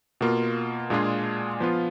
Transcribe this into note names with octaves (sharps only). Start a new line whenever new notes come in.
B2 A#3 F4
A#2 G#3 D4 F4 G#4
F3 B3 F4